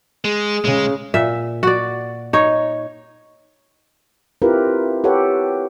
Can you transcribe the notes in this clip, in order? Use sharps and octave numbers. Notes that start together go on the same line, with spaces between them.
G#3 G#4
C#3 G#3
A#2 E5
F#4 D5
D#4 C#5
C4 E4 F4 G4 A#4 B4
G4 A4 B4 C#5 F#5